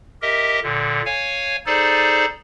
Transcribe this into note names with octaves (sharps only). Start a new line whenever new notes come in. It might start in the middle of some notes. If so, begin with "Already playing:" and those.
G4 A#4 D#5 E5
A#2 D3
C#5 F5 G#5
D#4 G#4 A4 C5 D5